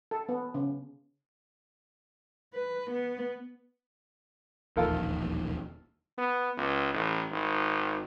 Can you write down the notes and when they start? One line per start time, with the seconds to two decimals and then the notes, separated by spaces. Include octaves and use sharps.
0.11 A4
0.29 B3
0.54 C#3
2.54 B4
2.91 B3
4.77 E1 A#1 D#2 F4 A4 A#4
6.18 B3
6.57 C#2
6.94 A1
7.31 G#1